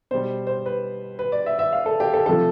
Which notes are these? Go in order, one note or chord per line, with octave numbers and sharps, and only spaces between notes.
B2 G3 C5
C5
B4
B4
D5
E5
E5
F5
A4
G4
A4
C3 F3 A3 A4